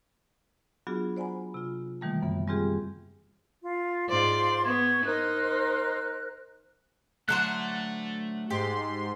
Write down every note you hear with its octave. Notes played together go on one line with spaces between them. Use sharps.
F#3 B3 D4 F4 F#4 G#4
C5 D5 F#5 G#5 A#5 B5
C3 F4
B2 D#3 E3 G3 A3 A#3
F#2 C#3 B3 E5
G3 G#3 C4 F4 G4 G#4
F4
G#2 F4 C5 D5 C6
B3 C#6 G#6
D#4 A#4 C5 F#6
D3 F#3 A3 C5 A5 F#6
G#2 G4 C6